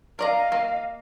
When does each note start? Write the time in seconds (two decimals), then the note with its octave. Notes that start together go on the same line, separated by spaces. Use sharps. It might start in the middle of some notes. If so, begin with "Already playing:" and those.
0.19 A#4 D5 D#5 F5 A#5
0.52 A#3